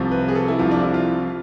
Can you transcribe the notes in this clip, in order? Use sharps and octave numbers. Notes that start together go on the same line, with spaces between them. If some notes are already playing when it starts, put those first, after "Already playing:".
Already playing: C2 C3 F3
B4
G#4
A4
E4
C2 C3 F3 F4
D4
E4
F4